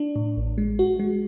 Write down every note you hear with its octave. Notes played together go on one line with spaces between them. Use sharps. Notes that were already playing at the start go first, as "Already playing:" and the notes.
Already playing: D4
A2
A1
G#3
F#4
G#3